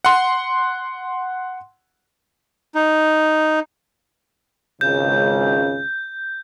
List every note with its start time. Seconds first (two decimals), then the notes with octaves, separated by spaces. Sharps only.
0.05 F#5 C6
2.75 D#4
4.81 G#1 C#2 C#3 G6